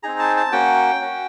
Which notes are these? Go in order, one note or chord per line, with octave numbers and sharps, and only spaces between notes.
C4 D#4 G#4 A#5
A5
A5
A#3 C#4 F#4 G5
C#4 F#4